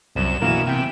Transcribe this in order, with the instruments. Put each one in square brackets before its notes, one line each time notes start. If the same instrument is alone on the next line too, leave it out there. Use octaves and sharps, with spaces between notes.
[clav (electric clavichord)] C2 [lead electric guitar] F#2 [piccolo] E7
[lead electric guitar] B2 F#4 [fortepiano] E3 A#3 E4 [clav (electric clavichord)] A#4 F5
[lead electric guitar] C3 [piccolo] G5